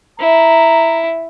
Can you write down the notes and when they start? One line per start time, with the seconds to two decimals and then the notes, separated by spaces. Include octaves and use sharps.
0.20 E4 A#5